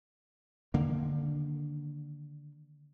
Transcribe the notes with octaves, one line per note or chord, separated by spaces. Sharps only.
D3 D#3 A#3